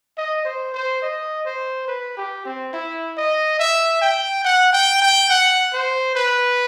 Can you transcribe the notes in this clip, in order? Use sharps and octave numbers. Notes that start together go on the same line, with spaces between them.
D#5
C5
C5
D#5
C5
B4
G4
C4
E4
D#5
E5
G5
F#5
G5
G5
F#5
C5
B4